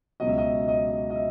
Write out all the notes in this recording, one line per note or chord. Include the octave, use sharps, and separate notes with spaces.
C#2 B2 F#3 D#5
E5
D#5
D#5
D#5
E5